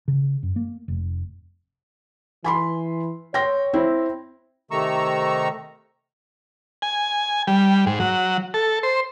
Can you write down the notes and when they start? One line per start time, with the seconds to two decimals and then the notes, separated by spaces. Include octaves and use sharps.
0.08 C#3
0.43 F#2
0.56 A#3
0.88 F1
2.44 E3 G#5 B5 C6
3.34 C#5 G5 C6 A#6
3.73 C4 E4
4.71 C3 D#3 A3 A#5 C#6 E6
6.82 G#5
7.47 G3
7.86 G#2
8.00 F#3
8.54 A4
8.83 C5